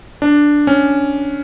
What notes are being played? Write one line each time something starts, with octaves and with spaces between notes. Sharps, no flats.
D4
C#4